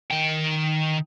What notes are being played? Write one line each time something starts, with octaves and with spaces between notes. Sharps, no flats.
D#3 G5